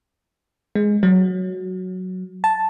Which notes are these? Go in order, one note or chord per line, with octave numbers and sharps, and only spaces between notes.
G#3
F#3
A5